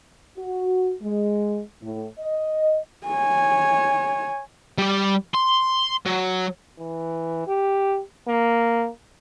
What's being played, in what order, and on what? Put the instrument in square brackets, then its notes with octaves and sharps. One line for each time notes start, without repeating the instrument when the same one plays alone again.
[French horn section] F#4
G#3
A2
D#5
[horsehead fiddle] C#5 G#5
[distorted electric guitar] G3 D5
C6
F#3
[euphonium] E3
G4
A#3